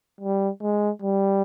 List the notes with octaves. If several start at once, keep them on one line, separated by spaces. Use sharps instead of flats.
G3
G#3
G3